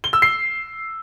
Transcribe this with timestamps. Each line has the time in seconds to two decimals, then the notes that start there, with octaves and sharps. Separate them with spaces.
0.04 G7
0.13 E6
0.22 C7